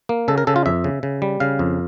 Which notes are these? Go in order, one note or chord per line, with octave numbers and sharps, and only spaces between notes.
A#3
C#3 A4
A#4
C#3 A4
F4
F2 E5
C#3
C#3
G3
C#3 F5
F2